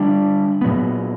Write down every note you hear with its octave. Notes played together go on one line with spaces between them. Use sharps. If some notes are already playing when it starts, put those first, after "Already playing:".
Already playing: D3 G3 D4
A#2 F#3 B3